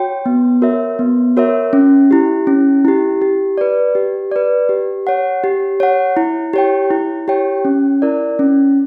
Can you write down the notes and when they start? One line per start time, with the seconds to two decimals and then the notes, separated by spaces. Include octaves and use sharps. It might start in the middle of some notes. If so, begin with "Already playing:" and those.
Already playing: F#4 C#5 G5
0.26 B3
0.62 F#4 A#4 C#5 E5
0.99 B3
1.37 F#4 A#4 C#5 E5
1.73 C#4
2.11 E4 G4
2.47 C#4
2.85 E4 G4
3.22 G4
3.58 B4 D5
3.95 G4
4.32 B4 D5
4.69 G4
5.07 C#5 F#5
5.44 G4
5.80 C#5 F#5
6.17 E4
6.53 G4 C#5 G5
6.91 E4
7.28 G4 C#5 G5
7.65 C#4
8.02 E4 A#4 D5
8.39 C#4